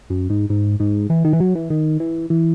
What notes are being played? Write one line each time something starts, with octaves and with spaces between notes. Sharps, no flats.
F#2
G#2
G#2
G#2
E3
D#3
E3
F#3
E3
D#3
E3
E3